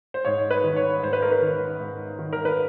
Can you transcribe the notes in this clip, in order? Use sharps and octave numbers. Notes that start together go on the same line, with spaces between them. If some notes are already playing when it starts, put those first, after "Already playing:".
C5
G#2 C#5
B4
D#3
C#5
G#2 C5
B4
A#4
B4
D#3
G#2
D#3
A#4
B4